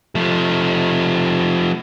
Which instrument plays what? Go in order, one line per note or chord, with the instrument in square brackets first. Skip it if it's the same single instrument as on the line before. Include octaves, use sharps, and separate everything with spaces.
[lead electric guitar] F3 A3